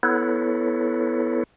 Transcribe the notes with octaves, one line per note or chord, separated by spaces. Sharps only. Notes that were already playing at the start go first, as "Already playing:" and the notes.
B3 E4 A4 B4 C#5